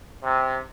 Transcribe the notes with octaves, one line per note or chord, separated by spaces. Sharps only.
C3